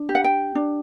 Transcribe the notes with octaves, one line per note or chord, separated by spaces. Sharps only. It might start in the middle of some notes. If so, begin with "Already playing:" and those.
Already playing: D4
G4
F#5
G5
D4